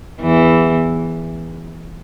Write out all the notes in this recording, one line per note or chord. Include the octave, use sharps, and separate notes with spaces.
E2 E3